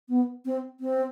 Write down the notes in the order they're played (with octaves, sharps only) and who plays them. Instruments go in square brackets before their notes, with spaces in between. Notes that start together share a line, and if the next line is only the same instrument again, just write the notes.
[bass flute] B3
C4
C4